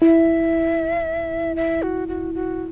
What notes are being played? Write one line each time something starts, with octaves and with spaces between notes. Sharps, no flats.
E4 E5
E5
F#4
F#4
F#4